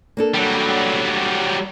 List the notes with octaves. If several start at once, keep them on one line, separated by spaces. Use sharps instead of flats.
A#3 D4 A4
F#3 G3